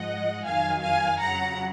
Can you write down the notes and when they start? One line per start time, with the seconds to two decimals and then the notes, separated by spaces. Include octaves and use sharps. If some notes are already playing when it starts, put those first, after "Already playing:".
Already playing: G#2 F3 G#3 D#5 F#5
0.44 F2 D#3 F#3 F5 G#5
0.82 F5 G#5
1.19 F2 C#3 F#3 F#5 A#5